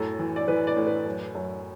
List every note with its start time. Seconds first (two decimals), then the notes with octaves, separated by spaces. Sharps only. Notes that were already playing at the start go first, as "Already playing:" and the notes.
Already playing: F#2 A2 A4
0.19 E3
0.36 D5
0.48 E3 B4
0.67 D5
0.76 A2
0.86 B4
1.06 F#2
1.35 F#2